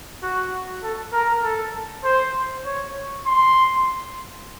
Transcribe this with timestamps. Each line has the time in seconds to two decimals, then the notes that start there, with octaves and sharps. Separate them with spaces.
0.23 F#4
0.83 A4
1.13 A#4
1.44 A4
2.04 C5
2.65 C#5
3.27 C6